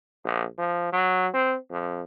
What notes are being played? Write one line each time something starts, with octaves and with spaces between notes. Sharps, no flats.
A#1
F3
F#3
C4
F2